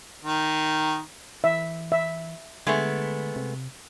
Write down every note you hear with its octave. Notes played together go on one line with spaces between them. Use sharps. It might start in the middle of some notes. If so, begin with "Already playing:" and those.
D#3
E3 E5
E5
D3 G#3 A3 B3
C3